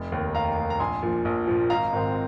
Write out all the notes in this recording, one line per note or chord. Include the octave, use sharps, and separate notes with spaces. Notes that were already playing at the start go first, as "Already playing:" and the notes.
Already playing: F1
D#2 D#3
F1 F5 A#5
D#2 D#3
A#5
A#1 G#5 C6
A#2 F3
A#1
A#2 F3
G#1 F5 A#5
G#2 D#3 C4